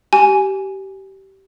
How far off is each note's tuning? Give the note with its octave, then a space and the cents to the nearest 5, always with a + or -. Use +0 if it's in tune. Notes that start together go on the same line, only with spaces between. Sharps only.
G4 -25 G#5 +0